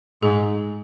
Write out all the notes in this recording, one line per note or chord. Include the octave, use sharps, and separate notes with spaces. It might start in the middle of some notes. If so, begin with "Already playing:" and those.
G#2 G#4